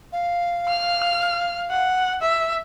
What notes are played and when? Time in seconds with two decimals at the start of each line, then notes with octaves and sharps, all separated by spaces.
0.13 F5
0.69 F6
1.70 F#5
2.22 E5